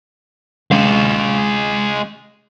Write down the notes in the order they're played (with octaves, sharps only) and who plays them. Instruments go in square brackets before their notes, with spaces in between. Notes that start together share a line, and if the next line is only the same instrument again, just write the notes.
[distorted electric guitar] G#3 F5